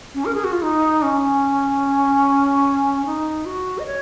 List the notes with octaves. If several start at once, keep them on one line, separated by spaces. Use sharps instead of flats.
C#4
A#4
G#4
F#4
F4
D#4
C#4
D#4
F#4
D#5
C#5